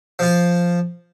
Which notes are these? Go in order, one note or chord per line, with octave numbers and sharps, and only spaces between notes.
F3 F4